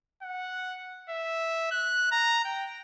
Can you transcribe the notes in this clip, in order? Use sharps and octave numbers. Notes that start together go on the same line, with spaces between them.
F#5
E5
F#6
A#5
G5